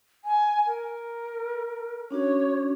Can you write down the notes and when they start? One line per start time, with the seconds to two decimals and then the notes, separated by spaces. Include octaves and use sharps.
0.24 G#5
0.67 A#4
2.11 C#4 D4 F#4 C#5